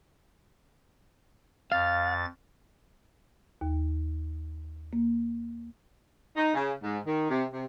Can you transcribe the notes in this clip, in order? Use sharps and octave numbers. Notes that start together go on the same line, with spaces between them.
F2 F5 A6
D#2
A#3
D#4
C#3
G#2
D#3
C3
C3